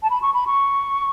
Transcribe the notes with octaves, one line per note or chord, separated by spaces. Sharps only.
A5
B5
C#6
B5
C#6